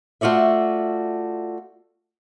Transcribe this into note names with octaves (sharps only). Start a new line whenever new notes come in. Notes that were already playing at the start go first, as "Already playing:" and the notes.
A3 F4 F#4 D5 E5